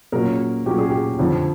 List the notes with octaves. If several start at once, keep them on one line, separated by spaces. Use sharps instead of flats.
A#2 F#3 A#3 C#4 G#4 A#4
A#2 F#3 A#3 C#4 G4
G#4
G4
F2 D3 F3